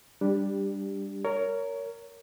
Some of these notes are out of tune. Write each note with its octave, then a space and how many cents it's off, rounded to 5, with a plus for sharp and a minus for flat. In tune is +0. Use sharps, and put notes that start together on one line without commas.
G3 +15 D4 +0 G4 +0
A#4 -10 C#5 +20